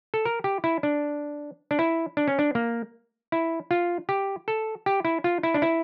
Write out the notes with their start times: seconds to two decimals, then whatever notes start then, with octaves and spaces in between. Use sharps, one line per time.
0.14 A4
0.25 A#4
0.44 G4
0.64 E4
0.83 D4
1.71 D4
1.79 E4
2.17 D4
2.28 C#4
2.39 D4
2.55 A#3
3.32 E4
3.71 F4
4.09 G4
4.48 A4
4.86 G4
5.05 E4
5.24 F4
5.43 E4
5.54 D4
5.62 E4